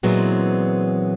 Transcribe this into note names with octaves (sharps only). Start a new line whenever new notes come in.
A#2 E3 F#3 G#3 B3 C4